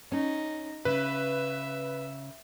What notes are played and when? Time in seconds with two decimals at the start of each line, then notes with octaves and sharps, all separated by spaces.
0.12 C#4 D#4
0.85 C#3 B4 E5